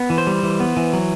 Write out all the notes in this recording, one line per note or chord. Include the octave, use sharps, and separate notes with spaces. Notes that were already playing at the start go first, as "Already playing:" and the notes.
Already playing: B3
E3
C5
G3
E3
B3
E3
F#3